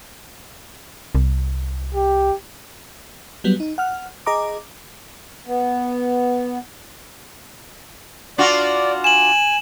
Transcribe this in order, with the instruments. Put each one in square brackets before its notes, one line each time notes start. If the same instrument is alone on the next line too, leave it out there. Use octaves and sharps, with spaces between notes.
[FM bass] C2
[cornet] G4
[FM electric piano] F#3 G3 B3
D#4
F#5 F6
G#4 D#5 A#5 D6
[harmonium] B3
[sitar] D4 F4 F#4 [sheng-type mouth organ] D5
[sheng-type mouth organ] G#5 [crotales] E7 F#7